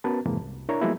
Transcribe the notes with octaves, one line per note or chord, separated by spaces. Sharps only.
B3 C#4 F#4 A#4 B4 A5
F2 G#2 C3 E3 G#3 A#3
C2
D4 E4 A#4 C#5 A#5
F3 F#3 G#3 A#3 B3 E4